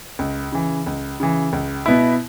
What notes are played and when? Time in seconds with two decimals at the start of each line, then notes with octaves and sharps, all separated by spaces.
0.19 C#2
0.52 C#3 E3
0.87 C#2
1.20 C#3 E3
1.53 C#2
1.86 B2 B3 E4